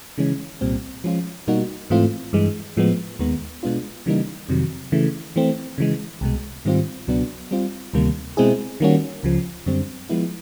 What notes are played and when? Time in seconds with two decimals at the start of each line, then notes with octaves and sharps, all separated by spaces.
0.18 C#3 E3 G#3 C#4
0.61 C2 A#2 G3 C4
1.04 F3 G#3 C#4 F4
1.48 B2 G3 A#3 D#4 F#4
1.90 G#2 E3 A3 C4 F4
2.33 G2 E3 G#3
2.77 A2 F3 G#3 B3
3.19 D#2 D#3 G#3 B3
3.63 B2 G#3 B3 D4 F4
4.06 C#3 E3 G3 A#3 D#4
4.49 F2 C3 D#3 F#3
4.92 C#3 E3 A3
5.36 E3 A3 C4
5.78 C#3 E3 G#3
6.21 C2 B2 G#3
6.65 G#2 D#3 G3 C4 F4
7.08 C#2 B2 F#3 B3 D4
7.51 G3 C4 F4
7.94 D2 C3 D#3 G3 A#3
8.37 B2 G#3 C4 E4 G#4
8.80 D#3 G3 A#3 C#4 F#4
9.23 C#2 C#3 F3
9.66 F#2 D3 G3 C4
10.09 F3 G#3 B3 E4